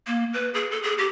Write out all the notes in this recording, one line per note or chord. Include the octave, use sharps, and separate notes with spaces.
A#3
B4
G#4
A4
G#4
G4